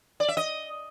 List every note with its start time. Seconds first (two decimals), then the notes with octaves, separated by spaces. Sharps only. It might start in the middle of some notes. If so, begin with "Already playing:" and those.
0.20 D5
0.28 E5
0.37 D#5